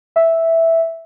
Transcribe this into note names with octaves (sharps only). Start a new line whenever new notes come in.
E5